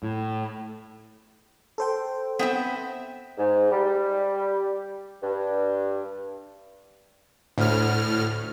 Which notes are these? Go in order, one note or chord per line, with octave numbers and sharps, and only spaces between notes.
A2
A4 C5 G5
B3 C4 E5
G#2
G3
G2
D2 A2 F6